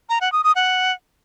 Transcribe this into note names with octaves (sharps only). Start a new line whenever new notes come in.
A#5
F#5
D#6
D#6
F#5